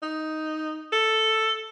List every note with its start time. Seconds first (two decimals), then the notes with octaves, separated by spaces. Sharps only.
0.02 D#4
0.92 A4